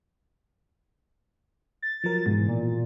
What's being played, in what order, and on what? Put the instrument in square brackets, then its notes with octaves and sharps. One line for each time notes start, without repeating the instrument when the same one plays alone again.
[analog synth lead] A6
[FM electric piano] F3 F#3 A#4
[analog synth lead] G#2 [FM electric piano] B2 E3
[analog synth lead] A#2